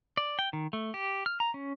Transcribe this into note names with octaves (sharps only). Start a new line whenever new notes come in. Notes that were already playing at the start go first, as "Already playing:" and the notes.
D5
G5
D#3
A3
G4
F6
A#5
C#4